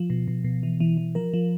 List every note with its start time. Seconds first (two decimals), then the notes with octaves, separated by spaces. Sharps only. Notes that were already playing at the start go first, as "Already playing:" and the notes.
Already playing: F3
0.10 B2
0.28 B2
0.44 B2
0.63 E3
0.80 E3
0.97 E3
1.15 F3 A#4
1.34 F3